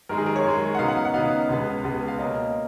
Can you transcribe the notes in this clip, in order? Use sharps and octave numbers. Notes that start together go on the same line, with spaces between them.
F#2 D#3 G#3 A#4
G#4
A#4
C#5
F#2 D#3 G#3
F#5
C#3 F#3 B3 D#4 F5
F#5
F5
F#5
C#3 F#3 B3 D#4 F5
C#2 C#3 G#3 B3
C#2 C#3 G#3 B3
F5
B2 A#3 C#4 D#5